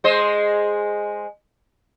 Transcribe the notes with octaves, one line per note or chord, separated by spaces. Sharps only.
G#3 C5 D#5